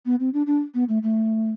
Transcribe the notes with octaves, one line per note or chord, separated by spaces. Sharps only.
B3
C4
D4
D4
B3
A3
A3